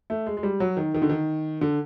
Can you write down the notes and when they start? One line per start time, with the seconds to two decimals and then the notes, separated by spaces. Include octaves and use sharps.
0.10 A3
0.27 G#3
0.37 G#3
0.43 G3
0.60 F#3
0.77 D#3
0.94 D#3
1.02 D3
1.09 D#3
1.61 D3